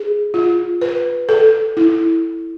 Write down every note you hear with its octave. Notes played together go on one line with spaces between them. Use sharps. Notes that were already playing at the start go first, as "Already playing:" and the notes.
Already playing: G#4
F4
B4
A4
E4